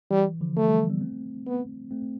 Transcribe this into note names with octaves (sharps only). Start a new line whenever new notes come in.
E3 G3
D3 F3
D3 F3 A3
E3 G3
G3 B3
A3 C4
B3
A3 C4